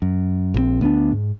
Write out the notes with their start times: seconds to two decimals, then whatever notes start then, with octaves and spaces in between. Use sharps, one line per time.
0.02 F#2
0.54 A#1 F3 C4
0.81 D2 B3 C#4 D4
1.12 G#2